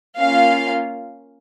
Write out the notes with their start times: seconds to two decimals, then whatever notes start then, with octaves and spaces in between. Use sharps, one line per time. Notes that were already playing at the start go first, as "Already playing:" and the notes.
0.17 A#3 C#4 F4 F5